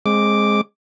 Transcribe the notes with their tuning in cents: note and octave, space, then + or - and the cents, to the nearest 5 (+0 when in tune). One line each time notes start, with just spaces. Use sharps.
G#3 +0 C4 +25 D6 +0